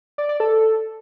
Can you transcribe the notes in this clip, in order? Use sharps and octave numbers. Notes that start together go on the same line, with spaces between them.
D5
D5
A4